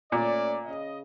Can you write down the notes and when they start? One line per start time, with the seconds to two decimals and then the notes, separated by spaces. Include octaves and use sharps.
0.12 A#2 A3 C#4 D5
0.66 C#3 D#5